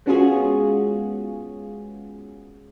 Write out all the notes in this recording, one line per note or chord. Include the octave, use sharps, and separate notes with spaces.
G#3 B3 C#4 F4 F#4 G#4